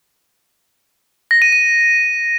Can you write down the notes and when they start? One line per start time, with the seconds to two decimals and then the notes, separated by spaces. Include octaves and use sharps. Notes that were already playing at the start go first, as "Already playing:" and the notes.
1.31 A#6
1.42 D#7
1.52 D#7